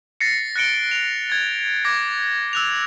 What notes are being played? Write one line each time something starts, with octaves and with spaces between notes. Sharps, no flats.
A6 A#6 C7 C#7
F#6 A#6 C#7 D7 G7
F7
G#6 A6
D6 G#6 A#6
E6 F#6 F7